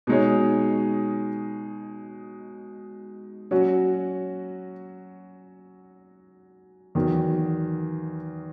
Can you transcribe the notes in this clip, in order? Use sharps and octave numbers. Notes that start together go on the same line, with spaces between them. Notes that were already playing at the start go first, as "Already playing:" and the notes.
B2 G#3 D#4 G#4 C#5
F#3 C#4 F#4
E2 D#3 F#3